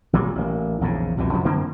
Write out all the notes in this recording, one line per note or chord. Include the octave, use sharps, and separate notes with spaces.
G#1 A#2 F#3 G3
A1 A#3
A#1 E2 G#2 C#3
C2 F2 B2 E3
F2 C#3 F3 F#3
F#2 D3 A#3 C4